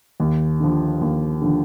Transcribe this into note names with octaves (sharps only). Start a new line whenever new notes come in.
D#2
D3 F3
D#2
D3 F3